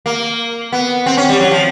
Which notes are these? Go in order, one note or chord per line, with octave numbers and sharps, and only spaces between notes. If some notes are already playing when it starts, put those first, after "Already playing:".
A#3
B3
C4
C#4
G3
F#3
F3